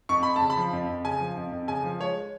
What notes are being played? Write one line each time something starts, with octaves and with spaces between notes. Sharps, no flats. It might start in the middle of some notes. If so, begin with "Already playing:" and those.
F2 C#6
F2 B5
C#3 A5
B5
F3
F2
F2
C#3 G#5
F3
F2
F2
C#3 G#5
F3
G#3 C#5